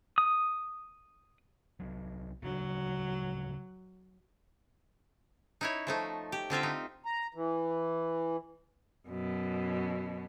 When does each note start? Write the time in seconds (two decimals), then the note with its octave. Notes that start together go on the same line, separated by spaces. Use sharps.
0.18 D#6
1.80 C2 F#3
2.43 D1 C#3 F#3 D4
5.61 D#4 E4 C#5
5.87 F3 A3 D#4
6.32 G4
6.50 D3 C4 F4 E5
6.63 D#4
7.05 A#5
7.34 E3
9.08 F#2 B2